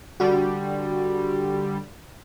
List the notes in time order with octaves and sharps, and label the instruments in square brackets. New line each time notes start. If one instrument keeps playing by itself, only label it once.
[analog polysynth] D3 G3 [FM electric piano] F#4